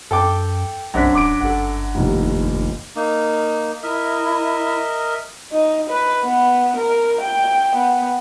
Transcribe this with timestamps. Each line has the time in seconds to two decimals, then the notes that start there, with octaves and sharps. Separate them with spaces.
0.11 F#2 A4 G5 D6
0.94 B1 F#2 C4 D4 B6
1.13 D1 C6 D6 D7
1.41 G1 A4 F#5
1.95 F1 D#2
2.96 A#3 D#4
3.83 E4 A#4 D#5 E5
5.52 D#4
5.90 B4
6.23 B3
6.76 A#4
7.21 G5
7.75 B3